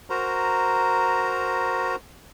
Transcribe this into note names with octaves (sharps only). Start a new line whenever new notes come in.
F#4 A#4 C5 A#5